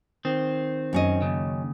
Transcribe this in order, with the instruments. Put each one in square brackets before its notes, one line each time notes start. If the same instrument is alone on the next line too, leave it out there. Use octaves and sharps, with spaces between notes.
[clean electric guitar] D#3 C4
[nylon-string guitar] F#2 C#4 D#5
[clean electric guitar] D#2 C#3